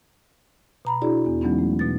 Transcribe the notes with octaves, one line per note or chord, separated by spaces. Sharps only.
B2 A#5 B5
D4 E4 F#4 G#4 D5
E2 B3
E3 F#3 G#3 B3 C#4 D#4
A3
B2 A6